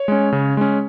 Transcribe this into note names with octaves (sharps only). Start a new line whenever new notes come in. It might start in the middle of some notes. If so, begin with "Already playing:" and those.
Already playing: C#5
G#3 C#4
C#3
G#3 C#4